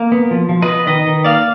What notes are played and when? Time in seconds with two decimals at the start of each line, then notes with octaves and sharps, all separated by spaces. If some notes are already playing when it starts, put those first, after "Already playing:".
Already playing: A#3
0.12 B3
0.31 F3
0.49 F3
0.62 B4 D#5
0.68 B3
0.87 D#3 B4 D#5
1.07 D#3
1.24 A#3 D5 F5